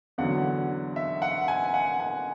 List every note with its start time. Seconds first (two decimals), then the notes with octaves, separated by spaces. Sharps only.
0.18 E2 D3 F#3 F#5
0.96 E5
1.22 F#5
1.48 G#5
1.74 F#5
2.00 G#5